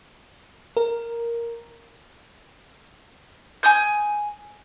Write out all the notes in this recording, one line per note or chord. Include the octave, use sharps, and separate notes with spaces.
A#4
G#5 D#6 G6